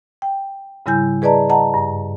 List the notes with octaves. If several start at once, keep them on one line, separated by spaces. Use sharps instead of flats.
G5
G#2 C#3 G3 E4 G#5 G6
G#4 B4 D5 D#5 A5 A#5
D#5 F#5 A5 A#5
G2